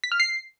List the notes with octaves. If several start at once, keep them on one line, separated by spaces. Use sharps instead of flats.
B6
F6
C7